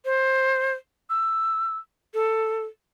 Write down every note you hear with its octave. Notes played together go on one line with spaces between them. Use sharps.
C5
E6
A4